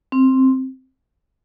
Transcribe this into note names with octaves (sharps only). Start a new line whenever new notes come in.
C4